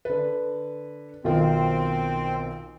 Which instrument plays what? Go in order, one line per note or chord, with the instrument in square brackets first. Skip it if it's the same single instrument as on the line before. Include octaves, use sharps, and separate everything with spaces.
[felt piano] D3 B4
[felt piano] B1 D#3 F4 [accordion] C4